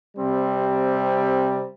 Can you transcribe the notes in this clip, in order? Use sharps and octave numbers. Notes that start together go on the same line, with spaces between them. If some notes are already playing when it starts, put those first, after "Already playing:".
C3 G3 C4